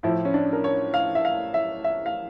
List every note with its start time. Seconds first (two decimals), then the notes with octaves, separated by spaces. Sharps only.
0.03 A2 F3 E4
0.25 C#4
0.34 D4
0.53 A#4
0.64 C#5
0.94 F5
1.15 E5
1.25 F5
1.54 E5
1.84 E5
2.06 F5